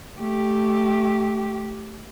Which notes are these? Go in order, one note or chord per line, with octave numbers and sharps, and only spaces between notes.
A3 G4